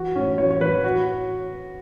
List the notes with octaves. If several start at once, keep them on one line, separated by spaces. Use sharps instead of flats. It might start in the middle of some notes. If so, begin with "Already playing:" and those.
Already playing: E3 F#4
A2 C#4
E3 C#5
C#5
E3 B4
F#4